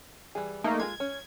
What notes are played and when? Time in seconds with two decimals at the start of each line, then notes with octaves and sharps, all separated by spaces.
0.35 E3 G3 G#4
0.64 A3 A#3 D#4
0.80 G#3 F4 G#4 G#6
1.00 C#4